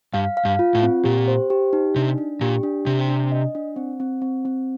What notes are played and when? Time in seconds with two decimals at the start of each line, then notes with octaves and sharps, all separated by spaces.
0.14 G2 F5
0.37 F5
0.45 G2
0.59 F4
0.75 A2
0.83 C4
1.04 A#2 G4
1.28 C5
1.50 G4
1.73 D#4
1.96 C3 D4
2.18 D4
2.41 A#2 G4
2.63 D4
2.86 C3 D4
3.08 D4
3.32 D#5
3.55 D4
3.76 C4
4.00 C4
4.22 C4
4.45 C4